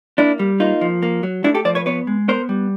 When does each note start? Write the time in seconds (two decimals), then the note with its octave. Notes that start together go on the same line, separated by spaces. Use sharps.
0.18 A#3 D4 E4
0.39 G3
0.60 A#3 D#4 F4
0.81 F3
1.03 A#3
1.23 F#3
1.44 A3 D4 E4
1.54 G4 A4
1.65 F3 C5 D5
1.75 B4 C#5
1.86 B3 B4 C#5
2.07 G#3
2.28 B3 A#4 C5
2.49 G3